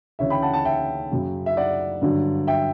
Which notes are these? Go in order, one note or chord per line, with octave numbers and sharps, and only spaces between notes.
D2 C#3 E3 C#5 E5
G5 B5
F#5 A5
F#5 A5
E5 G5
F#2 C#3 F#3
E5
D5 F#5
G2 D3 F#3
E5 G5